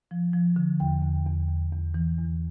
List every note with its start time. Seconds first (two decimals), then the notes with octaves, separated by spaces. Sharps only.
0.11 F3
0.34 F3
0.56 D3
0.80 E2 G5
1.03 E2
1.26 E2
1.49 E2
1.72 E2
1.94 E3
2.18 E2